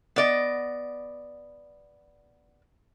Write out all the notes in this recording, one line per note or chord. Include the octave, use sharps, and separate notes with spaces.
B3 D5 D#5